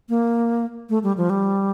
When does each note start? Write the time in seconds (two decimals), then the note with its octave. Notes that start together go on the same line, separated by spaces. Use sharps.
0.09 A#3
0.89 A3
1.03 G3
1.17 F3
1.30 G3